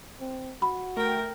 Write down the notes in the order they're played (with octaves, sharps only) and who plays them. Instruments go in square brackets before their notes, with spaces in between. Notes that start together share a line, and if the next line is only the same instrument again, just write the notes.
[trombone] C4
[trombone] F#4 [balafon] B5
[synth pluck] A3 G5 [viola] A#4